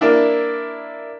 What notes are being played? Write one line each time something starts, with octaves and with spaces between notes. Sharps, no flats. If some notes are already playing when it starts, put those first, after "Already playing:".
A#3 D4 E4